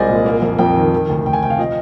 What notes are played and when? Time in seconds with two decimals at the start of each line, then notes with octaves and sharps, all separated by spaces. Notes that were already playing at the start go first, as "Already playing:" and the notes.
Already playing: C2 F3 G#3 C5 D5 D#5 G#5
0.09 A#2
0.26 A#3
0.42 F2
0.58 F2 G5
0.76 D#3
0.92 D#3
1.10 D2
1.25 D2 G5
1.33 G#5
1.43 C3 G5
1.50 F5
1.58 F3 D#5